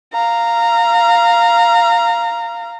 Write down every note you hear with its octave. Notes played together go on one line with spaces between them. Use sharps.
F5 A#5